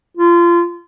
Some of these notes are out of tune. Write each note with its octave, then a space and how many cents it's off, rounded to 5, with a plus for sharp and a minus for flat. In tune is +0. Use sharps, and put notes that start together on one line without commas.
F4 -25